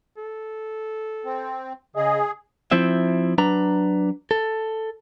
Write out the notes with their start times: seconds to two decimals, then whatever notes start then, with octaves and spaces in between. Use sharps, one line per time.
0.17 A4
1.25 C4
1.96 C#3 G#4 D#5
2.72 F3 C4 E4 E5
3.38 F#3 D4 B4 A#5
4.31 A4